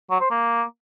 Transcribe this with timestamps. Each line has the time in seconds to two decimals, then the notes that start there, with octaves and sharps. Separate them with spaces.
0.11 F#3
0.21 C5
0.31 A#3